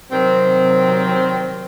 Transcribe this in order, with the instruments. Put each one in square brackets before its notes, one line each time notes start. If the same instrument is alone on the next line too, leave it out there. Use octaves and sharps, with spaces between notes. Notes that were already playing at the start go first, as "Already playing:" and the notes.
[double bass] C3 F#3 [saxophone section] D#3 G3 C4